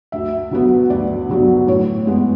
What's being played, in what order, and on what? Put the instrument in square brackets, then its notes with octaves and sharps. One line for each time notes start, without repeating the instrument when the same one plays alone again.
[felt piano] D2 E5
D3 F#3 B3
D2 D5
D3 F#3 B3
A2 C#5
G#3 B3